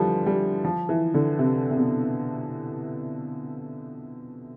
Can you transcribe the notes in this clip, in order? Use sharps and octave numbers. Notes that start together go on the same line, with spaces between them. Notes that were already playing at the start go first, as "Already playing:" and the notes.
Already playing: D3 E3 F3 G3
G3
F3
E3
D3
C3
C3
B2